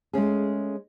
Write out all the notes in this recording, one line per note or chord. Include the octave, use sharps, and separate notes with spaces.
G#3 A3 C#4 G#4